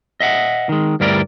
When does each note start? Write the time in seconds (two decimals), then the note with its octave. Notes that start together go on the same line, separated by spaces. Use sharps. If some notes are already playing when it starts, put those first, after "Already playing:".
0.20 D#5 E5 F#5
0.69 D#3 G#3
1.00 D2 G2 G3 E4 A#4 D5